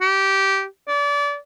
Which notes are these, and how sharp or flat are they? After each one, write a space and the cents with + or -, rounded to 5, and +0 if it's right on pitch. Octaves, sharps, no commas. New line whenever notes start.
G4 -15
D5 -30